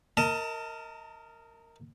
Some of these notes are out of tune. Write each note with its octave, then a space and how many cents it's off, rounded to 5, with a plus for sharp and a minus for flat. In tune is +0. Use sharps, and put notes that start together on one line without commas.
A#4 -15 D#5 +30 A5 +25